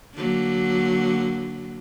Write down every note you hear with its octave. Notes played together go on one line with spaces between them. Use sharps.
D3 F#3 A#3